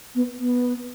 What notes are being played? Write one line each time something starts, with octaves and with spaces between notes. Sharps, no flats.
B3
B3